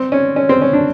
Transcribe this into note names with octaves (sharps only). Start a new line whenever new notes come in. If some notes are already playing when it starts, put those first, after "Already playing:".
Already playing: C4
C#4
C#4
C4
C#4
D4